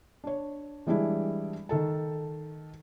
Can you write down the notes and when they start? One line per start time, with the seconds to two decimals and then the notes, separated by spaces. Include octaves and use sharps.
0.24 D4 C#5
0.87 E3 G3 G#3 D4 E4
1.69 D#3 A4 A5